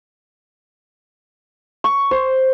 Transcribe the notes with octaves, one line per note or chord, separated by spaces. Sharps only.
C#6
C5